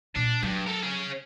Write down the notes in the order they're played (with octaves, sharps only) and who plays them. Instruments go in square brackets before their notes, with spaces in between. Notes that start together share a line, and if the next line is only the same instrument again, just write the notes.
[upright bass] A#2 [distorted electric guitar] D4
[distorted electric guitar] G2 [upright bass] F#3
[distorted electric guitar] A4 A#4
C#4 G#4